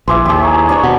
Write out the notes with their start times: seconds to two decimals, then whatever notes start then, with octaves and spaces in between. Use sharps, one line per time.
0.08 A#1 E4 G#4 B4 C6 D6
0.26 D#2 G4 G#4
0.42 G#5 A#5 C#6
0.69 D4 C#5 A#5 C#6
0.83 B2 F#5